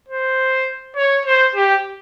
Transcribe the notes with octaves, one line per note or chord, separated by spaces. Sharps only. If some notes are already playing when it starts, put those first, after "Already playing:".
C5
C#5
C5
G4